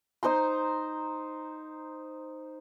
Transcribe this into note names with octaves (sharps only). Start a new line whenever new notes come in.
D#4 C5 A#5 C6